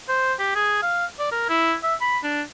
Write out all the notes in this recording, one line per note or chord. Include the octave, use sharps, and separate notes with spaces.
C5
G4
G#4
F5
D5
A#4
E4
E5
B5
D4